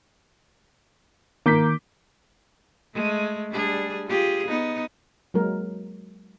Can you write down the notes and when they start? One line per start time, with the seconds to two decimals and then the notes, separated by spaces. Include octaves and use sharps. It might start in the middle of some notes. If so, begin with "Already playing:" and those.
1.46 D#3 A#3 D6 G6 B6
2.94 G#3 A3
3.51 G3 D4 G#4
4.07 F4 G4 G#4
4.47 B3 D#4
5.34 F#3 G#3 A#3 F#4 A#4